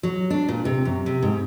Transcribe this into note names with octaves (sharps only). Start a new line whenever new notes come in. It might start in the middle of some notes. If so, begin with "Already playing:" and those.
F#3
D4
A#2
C3
F#2
C3
G#2